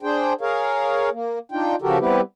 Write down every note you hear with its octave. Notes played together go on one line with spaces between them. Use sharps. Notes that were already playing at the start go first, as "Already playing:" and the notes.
D4 G#4 C5 G5
G#4 A#4 C#5 F5
A#3
D4 D#4 F4 G5
C#3 F3 F#4 G4 A4 A#4
G3 B3 C4 E4 G4 B4